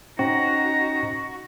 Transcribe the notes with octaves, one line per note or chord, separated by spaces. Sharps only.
C#4 D#4 F#4 C5 G5 A#5